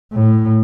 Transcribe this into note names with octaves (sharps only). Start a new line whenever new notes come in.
A2